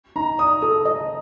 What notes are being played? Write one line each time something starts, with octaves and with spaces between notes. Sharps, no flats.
D#4 A#5
D5 D#6
A4 D#6
D#5